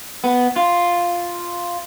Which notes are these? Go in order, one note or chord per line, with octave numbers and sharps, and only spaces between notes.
B3
F4